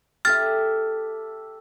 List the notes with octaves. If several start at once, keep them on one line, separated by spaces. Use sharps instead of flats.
G4 A4 E5 F6 A6